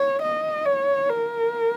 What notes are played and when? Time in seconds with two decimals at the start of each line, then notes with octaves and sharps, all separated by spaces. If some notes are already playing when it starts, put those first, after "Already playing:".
Already playing: C#5
0.22 D#5
0.66 C#5
1.10 A#4